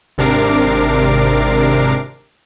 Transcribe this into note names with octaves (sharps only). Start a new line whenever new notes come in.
G#1 C3 D4 A#4 D6 C7